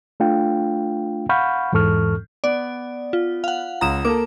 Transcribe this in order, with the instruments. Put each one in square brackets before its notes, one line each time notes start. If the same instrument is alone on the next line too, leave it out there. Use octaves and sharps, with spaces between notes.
[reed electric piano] A3 D4 F4 F5 G5
F5 F#5 B5 C#6 F6 G6
E2 G#2 E3 A4 C#6 F6
[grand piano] B3 [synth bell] D5
[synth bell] F4
F5 F#5
[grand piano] C#2 [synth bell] A#5 D#6 E7
[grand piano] A#3 A4 [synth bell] D6